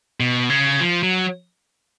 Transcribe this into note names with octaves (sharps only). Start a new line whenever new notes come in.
B2
C#3
F3
F#3